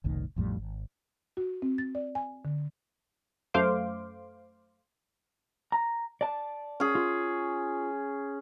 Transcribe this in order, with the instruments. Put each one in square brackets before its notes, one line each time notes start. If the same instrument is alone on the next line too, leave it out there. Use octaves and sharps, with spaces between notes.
[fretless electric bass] F#1 C2 A2 D#3
A1 F2 A2 G3
G#1
[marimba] F#4
C4
A6
D5
G#5
D3
[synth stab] F#2 A3 C5 F5 C6 D6
[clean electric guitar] A#5
D5 A5
[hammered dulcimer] C#4 G#4
[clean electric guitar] F4